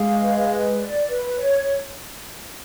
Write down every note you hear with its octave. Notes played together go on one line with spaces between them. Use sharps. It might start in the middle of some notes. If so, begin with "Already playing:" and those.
Already playing: G#3 F5
B4
B4
D5
B4
C#5